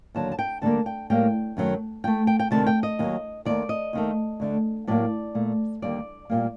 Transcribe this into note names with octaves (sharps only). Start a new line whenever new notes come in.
D#2 D3 F#3 A5
A5
G5
D2 D3 G3 A#3 A5
G5
A2 G3 A#3 G5
F#2 D#3 F#3 A3
A2 A3 G5
G5
G5
D2 C3 D#3 A3 A5
G5
D#5
D#2 D#3 F#3
D#2 D#3 A3 D5
D#5
D#2 D#3 A3
D2 D3 A3
A2 F#3 A#3 D5
A#2 A3
D#2 D3 G3 A#3 D5
A#2 G3 A#3